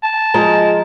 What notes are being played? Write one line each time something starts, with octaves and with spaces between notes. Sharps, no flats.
A5
F3 G#3 A#5